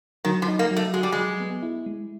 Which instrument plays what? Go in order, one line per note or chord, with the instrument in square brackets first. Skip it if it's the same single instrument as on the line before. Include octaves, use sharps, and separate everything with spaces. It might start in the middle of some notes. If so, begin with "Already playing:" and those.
[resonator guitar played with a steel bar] D#3 [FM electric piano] F#3
[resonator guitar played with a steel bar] F3
[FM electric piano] D#4
[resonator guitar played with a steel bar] A#3
[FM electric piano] F#3
[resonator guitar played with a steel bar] A3
[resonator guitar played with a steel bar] G#3 [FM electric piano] F#4
[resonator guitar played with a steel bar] G3
[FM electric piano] F#3 [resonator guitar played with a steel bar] G#3
[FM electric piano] B3
E4
G#3